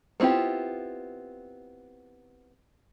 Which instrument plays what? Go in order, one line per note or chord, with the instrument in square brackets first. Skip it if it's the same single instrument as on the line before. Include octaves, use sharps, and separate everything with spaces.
[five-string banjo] B3 C4 E4 F4 G4